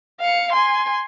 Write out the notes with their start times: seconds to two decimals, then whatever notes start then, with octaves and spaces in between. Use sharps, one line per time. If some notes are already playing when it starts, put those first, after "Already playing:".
0.20 F5 C#7
0.52 G#5 C6